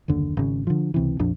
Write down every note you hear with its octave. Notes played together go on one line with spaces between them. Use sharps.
F#1 D#2 D3
G#1 C#3
D3 F3
C#2 C3 E3
A#1 F2 D4